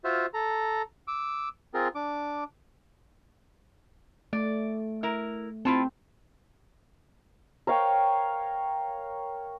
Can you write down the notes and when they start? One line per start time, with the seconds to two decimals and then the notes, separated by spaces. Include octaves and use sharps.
0.05 F4 F#4 C5 E5 F6
0.34 A4 A#5
1.08 D6 E6
1.74 C4 F4 G#4 A#4
1.95 D4 D6
4.33 A3 D5
5.03 E4 A#4
5.65 C4 E4 F4 A5
7.67 A#4 C#5 F5 G5